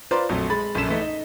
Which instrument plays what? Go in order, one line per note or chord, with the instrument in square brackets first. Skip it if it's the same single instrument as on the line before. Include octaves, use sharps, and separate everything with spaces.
[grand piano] F4 B4 C5 D5 A#5
A#1 F2 F#3 A3
G#3 B5 A6
A#1 F#2 A4 B6 E7
E3 A3 D#4
D#4